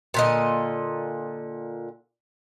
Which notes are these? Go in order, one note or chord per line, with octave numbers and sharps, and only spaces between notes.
A#2 D3 D#5